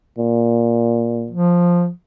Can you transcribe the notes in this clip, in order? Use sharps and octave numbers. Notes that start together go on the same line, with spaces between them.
A#2
F3